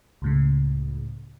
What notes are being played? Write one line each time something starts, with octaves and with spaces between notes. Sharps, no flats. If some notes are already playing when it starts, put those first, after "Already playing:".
C#2 A2 C#3